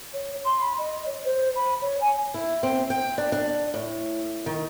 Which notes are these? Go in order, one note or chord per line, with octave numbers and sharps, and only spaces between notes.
C#5
C6
B5
D#5
C#5
C5
B5
C#5
G#5
E4
C4
G5
D4
D4
A2
D#3